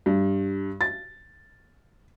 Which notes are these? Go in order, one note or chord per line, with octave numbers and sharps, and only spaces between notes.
G2
A6